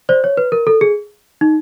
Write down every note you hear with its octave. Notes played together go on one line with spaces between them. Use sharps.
C5 D5
C#5
B4
A#4
A4
G#4
D#4